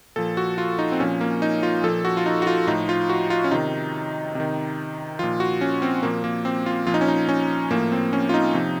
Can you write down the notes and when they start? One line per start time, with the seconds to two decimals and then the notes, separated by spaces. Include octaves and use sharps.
0.16 A#2 F3 A4
0.37 F#4
0.58 F4
0.79 D#4
0.92 C4
1.00 A#2 F3 C#4
1.21 A#3
1.42 D#4
1.63 F4
1.84 A#2 F3 A4
2.05 F#4
2.17 F4
2.26 D#4
2.42 F#4
2.47 F4
2.67 A2 F3 D#4
2.89 F4
3.09 F#4
3.30 F4
3.44 C#4
3.51 C3 D#3 D#4
4.35 C3 D#3
5.19 A#2 F3 F4
5.40 F#4
5.61 C#4
5.82 C4
6.03 A#2 F3 A#3
6.24 A#3
6.45 C4
6.66 F4
6.87 A#2 F3 F4
6.94 D#4
7.01 C#4
7.08 D#4
7.29 C#4
7.70 A2 F3 A#3
7.92 C4
8.13 C#4
8.29 F4
8.34 D#4
8.54 C3 F3